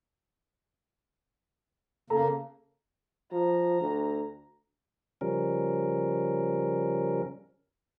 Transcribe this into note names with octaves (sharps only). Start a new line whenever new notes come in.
C#3 A#3 A4 A#5
F3 A#5
D2
C#3 F3 G3 C#4 A#4